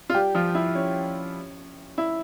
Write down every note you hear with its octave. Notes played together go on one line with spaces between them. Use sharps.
F4
G3 G4
F3 F4
E4
C#4
E4